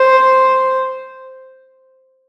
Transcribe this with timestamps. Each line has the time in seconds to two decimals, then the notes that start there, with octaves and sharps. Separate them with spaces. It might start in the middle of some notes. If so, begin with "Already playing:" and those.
Already playing: C5